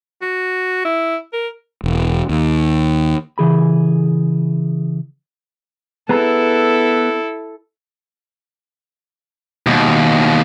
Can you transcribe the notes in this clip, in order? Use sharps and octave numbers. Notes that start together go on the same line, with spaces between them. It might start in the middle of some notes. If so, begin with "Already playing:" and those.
F#4
E4
A#4
E1
D#2
C#3 E3 G#4 B5
B3 E4 G#4 A4 A#5
D#2 B2